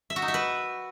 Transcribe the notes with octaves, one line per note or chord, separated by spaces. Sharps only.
E5
F#4
D#4
E5
B4